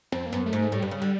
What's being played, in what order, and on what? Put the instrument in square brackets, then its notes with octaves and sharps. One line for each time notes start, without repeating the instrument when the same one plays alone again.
[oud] F2 [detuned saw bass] C4
[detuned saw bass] A#3
[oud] F#2 [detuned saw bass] B3
[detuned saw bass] A3
[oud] G#2
[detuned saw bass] A3
[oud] A2 [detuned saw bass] G3
[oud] G2
C#3
D3